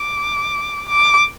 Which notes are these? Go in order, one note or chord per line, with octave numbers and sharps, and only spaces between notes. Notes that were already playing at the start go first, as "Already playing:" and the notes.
Already playing: D6
D6